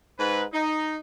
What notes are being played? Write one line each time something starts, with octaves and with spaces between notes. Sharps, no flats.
G#2 B4
D#4